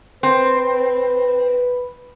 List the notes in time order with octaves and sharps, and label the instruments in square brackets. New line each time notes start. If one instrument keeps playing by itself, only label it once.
[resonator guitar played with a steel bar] C4 [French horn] B4